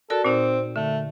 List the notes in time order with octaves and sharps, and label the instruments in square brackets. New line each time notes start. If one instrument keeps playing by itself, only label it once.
[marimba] F#4 A#4 D5 [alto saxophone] A4
[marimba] A#2 D#4 [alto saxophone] C4
[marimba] D3 [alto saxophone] A3